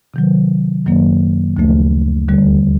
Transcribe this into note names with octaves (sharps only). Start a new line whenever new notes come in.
C3 D#3 F#3
F#2 D#3 F#3 A#3
D2 C#3 F3 A3
D#2 D3 G3